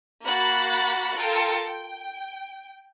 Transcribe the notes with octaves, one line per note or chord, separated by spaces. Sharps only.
A#3 F#4 F#5 B5 F#6 A6
F4 A4 A#4 G5
G5